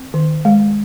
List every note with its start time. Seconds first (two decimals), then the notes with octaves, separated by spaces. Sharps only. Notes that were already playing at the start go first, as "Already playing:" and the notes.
Already playing: C4
0.14 D#3
0.45 G#3